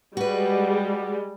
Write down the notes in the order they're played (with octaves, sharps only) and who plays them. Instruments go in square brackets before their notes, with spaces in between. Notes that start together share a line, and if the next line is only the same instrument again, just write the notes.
[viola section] G3 G#3 [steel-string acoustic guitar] F#4 B4